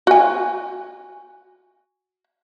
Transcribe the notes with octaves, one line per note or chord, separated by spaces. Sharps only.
F#4 G#5